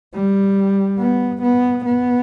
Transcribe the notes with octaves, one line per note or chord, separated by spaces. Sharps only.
G3
B3
B3
B3